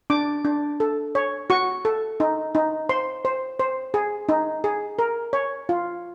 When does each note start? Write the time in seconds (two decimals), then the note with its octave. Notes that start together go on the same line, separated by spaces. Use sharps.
0.10 D4 D6
0.45 D4
0.80 A4
1.15 C#5
1.50 F#4 C#6
1.85 A4
2.20 D#4
2.55 D#4
2.89 C5 C6
3.25 C5
3.59 C5
3.94 G#4
4.29 D#4
4.64 G#4
4.99 A#4
5.33 C#5
5.69 F4